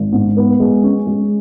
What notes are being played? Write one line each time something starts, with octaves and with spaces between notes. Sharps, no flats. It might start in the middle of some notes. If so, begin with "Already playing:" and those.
Already playing: G#1
G#2
B3
G#3
C#4
G#3